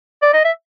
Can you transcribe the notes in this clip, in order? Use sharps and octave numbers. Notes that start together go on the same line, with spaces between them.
D5
D#5
E5